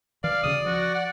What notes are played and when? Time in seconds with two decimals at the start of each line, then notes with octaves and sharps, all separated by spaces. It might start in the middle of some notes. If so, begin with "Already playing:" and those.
0.24 E3 D5 F5
0.43 D2 C#3 C#4 D#6
0.65 F3 F#4
0.95 F#5